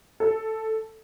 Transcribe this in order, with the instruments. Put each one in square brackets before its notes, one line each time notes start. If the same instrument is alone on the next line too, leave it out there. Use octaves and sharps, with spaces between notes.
[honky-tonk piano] A4